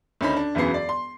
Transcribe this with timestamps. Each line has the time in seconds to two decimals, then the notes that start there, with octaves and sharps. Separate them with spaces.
0.21 D2 D#3 C#4 D#4 B5
0.37 D4
0.55 E1 F#2 E3 F#3 B3 C7
0.74 D5
0.89 C6